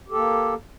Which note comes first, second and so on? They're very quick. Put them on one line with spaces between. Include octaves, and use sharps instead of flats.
G4 A4 A#3